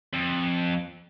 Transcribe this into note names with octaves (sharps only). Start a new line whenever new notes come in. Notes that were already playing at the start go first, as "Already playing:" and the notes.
F2